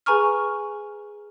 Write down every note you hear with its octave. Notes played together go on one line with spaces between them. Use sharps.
G#4 B4 G#5 A#5 C#6 F6